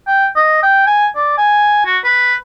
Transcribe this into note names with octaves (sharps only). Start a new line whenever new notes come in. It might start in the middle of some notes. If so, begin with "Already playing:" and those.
G5
D#5
G5
G#5
D5
G#5
F#4
B4